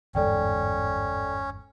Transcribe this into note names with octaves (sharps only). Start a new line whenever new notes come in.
G1 E2 G#2 C#4 A4 D5 G5